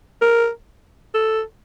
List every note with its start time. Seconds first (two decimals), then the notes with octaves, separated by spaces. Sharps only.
0.22 A#4
1.14 A4